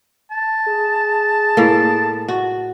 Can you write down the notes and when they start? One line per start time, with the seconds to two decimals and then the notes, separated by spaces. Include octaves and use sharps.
0.31 A5
0.68 G#4
1.57 A2 A#3
2.28 F#4